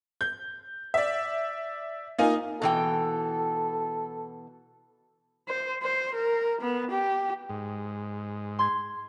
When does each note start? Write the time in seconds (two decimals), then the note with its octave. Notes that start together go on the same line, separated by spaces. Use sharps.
0.21 G6
0.94 D5 E5
2.18 A#3 D#4 F4 D#5 G#5
2.62 B2 E3 A4 G5
5.48 C5
5.83 C5
6.15 A#4
6.61 B3
6.91 G4
7.49 G#2
8.59 C6 G#6